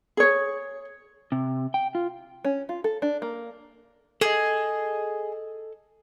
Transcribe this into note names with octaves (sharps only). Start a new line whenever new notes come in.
G#4 C#5
C3
G5
F4
C#4
F4
A4
D4
A#3
G#4 A4 D#5